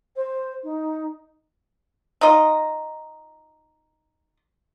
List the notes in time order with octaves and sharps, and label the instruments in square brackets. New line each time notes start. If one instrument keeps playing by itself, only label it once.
[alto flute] C5
D#4
[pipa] D#4 F4 D#5